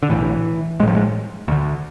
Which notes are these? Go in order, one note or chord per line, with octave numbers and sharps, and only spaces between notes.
D3
B1 A2 E3
A1 A2 F3 G#3
G#3
D2 D3